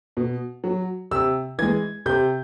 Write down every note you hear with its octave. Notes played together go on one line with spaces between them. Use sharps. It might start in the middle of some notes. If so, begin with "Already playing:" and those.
B2
F#3
C3 E6
E3 G#3 G#6
C3 G6